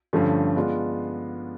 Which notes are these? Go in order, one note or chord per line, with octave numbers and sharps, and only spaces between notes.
G2 D3 F3 A3 C#4
G#3 B3 D4 F4